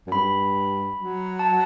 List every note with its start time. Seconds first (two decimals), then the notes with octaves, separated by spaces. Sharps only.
0.07 F#2
0.12 G2 B5
0.97 F#3
1.39 A5